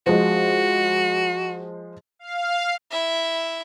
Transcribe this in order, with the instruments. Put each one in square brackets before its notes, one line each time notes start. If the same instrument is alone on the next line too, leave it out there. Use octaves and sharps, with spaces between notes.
[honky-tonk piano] F3 G#3 [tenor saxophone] F#4
[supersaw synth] F5
[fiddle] E4 E5